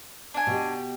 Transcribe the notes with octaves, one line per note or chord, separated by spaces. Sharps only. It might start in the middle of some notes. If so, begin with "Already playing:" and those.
D4 G#5
B2 G4